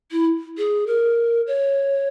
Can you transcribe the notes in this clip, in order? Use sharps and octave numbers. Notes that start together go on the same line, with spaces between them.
E4
G#4
A#4
C#5